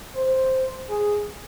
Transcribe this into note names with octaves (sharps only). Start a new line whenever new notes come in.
C5
G#4